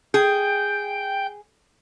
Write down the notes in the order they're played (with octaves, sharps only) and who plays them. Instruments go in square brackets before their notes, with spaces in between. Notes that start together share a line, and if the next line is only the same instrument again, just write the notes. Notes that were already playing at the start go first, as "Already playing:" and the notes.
[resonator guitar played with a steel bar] G#4 [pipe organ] G5 G6